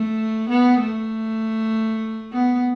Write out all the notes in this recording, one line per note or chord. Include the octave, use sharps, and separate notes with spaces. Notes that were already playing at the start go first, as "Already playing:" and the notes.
Already playing: A3
B3
A3
B3